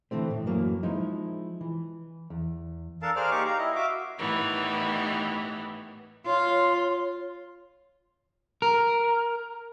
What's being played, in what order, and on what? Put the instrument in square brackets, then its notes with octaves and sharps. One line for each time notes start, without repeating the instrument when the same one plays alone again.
[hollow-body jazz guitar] D3 E3 A3 C4
A2
F#2 E3 F#3 A#3
F3 G#3 D#4 E4
E3
E2
[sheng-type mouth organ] D4 A4 A#4 F5 A5
G#4 A#4 C5 D5 F5 F6
A#3 D#4 G4 C#6 D6
F5 A#5
E4 D#5
F#4 E5 F5 D6
[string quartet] A2 D#3 E3 G3 B3
[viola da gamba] F4 [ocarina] C#5 [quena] C6
[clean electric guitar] A#4